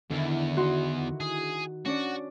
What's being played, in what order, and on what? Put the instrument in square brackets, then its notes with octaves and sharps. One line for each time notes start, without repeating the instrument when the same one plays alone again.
[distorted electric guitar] E2 [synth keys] D3 E4 [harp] D#3
[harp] D#4 F#4 C6
[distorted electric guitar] G#4
[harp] C#4 D4 D5 [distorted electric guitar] F#4